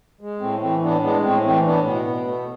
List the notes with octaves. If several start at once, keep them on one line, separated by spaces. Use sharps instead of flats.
G#3
A2 A3 C4
E3 A3 C4
A2 B3 D4
G#3 B3 D4
A2 A3 C4
E3 A3 C4
A2 B3 D4
B2 B3
B2
A3